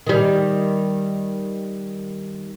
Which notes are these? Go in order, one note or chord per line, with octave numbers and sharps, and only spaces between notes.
D#3 G3